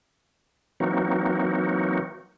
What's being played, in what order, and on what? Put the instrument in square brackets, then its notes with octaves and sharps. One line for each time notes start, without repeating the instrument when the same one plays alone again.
[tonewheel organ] E3 F#3 A#3 C4 D#4 F#4